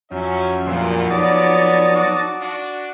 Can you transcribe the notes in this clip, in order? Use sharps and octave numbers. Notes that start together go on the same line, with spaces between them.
F2 F#3 C#4 E5
E2 G2 A#2 F3 F#3 C4
B3 D#4 C#5 D5 A5 D6
F#4 D6
D4 F#4